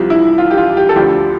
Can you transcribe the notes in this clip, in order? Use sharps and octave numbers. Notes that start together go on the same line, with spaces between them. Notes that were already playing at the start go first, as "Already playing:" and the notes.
Already playing: C2 C3 F3
E4
F4
G4
F4
G4
A4
D2 D3 F3 G4